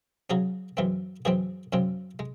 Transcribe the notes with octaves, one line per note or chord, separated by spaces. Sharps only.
C#3 F#3 C#4 G#4
F#2 E3 G#3 C4
F#2 E3 G#3 C4 G#4
F#2 C#3 G#3 C4
G#3